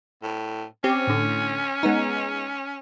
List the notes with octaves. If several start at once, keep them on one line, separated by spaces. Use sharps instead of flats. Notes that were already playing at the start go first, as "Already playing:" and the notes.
A2
C4 C#4 G4
A2 D3
G#3 B3 D#4